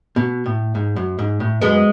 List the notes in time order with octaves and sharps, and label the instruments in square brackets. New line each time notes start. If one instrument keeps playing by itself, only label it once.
[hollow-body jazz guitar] B2
A2
G#2
F#2
G#2
A2
[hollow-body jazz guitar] F#2 [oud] G#3 B3